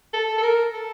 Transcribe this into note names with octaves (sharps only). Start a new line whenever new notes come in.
A4
A4
A#4
A4